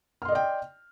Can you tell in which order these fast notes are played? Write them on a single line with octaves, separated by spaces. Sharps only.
F6 C6 D#5 D5 G5